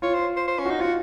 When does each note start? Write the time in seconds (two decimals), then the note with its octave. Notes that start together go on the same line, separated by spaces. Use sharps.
0.02 F4 C#5
0.14 C5
0.37 C5
0.48 C5
0.59 C#4
0.66 D#4 F#4
0.79 F4 F#4